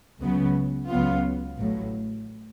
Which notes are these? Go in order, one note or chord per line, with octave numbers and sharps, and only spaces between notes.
C#2 C#3 F#3 B3
C#2 C#3 F#3 B3 F4
A1 A2 F#3